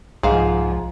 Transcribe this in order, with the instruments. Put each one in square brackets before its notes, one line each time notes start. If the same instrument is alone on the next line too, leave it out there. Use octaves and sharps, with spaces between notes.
[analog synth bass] C2 [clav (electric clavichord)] G#2 [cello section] F3 [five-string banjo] G#4 F5